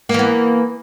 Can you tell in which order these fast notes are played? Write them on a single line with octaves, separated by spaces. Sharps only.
A#3 E3 B3